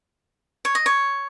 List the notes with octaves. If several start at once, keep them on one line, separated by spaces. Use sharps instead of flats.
C#5
D#5
C#5